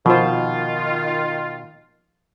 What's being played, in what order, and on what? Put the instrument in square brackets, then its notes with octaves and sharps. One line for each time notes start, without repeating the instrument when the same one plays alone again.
[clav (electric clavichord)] B2 [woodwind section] D#3 F4 [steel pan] F3 C5